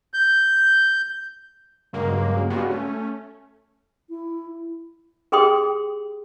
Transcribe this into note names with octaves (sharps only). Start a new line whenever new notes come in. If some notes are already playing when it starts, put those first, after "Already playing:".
G6
G2 C#3 F#3 G#3 A#3
G3 G#3 B3 C#4 F4 F#4
A3 C#4
E4
G4 G#4 G5 C6 D#6